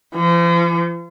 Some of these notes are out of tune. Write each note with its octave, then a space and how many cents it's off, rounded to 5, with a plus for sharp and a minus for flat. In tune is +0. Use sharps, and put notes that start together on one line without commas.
F3 -40